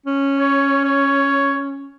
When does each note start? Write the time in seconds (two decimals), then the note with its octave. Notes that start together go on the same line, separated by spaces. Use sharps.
0.06 C#4
0.39 C#5
0.85 C#5